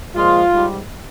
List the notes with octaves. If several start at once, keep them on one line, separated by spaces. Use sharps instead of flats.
A#2 F3 G#3 F4
G#2 G3